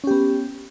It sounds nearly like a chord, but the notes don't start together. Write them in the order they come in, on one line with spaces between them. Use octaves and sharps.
C#4 G4 B3